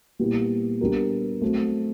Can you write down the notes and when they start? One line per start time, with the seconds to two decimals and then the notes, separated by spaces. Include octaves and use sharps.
0.19 A#2 G3 B3 E4 G4
0.81 G3 B3 D4 G4 A#4
1.41 F#3 A3 C4